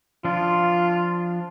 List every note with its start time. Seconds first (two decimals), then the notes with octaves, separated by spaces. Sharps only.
0.25 F3 D4 F4